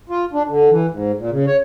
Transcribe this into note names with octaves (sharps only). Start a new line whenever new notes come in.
F4
D4
D3
E3
G#2
A#2
C#3
C#5